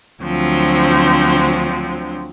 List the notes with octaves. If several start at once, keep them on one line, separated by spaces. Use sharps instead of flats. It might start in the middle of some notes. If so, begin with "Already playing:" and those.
D2 D3 F3 F#3 C4